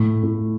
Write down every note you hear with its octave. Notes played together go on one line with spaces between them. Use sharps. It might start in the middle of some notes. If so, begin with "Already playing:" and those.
Already playing: A2
A2